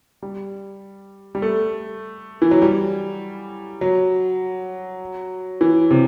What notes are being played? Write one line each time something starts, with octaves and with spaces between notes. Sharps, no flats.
G3
G3
A3
E3
F#3
G3
F#3
E3
C3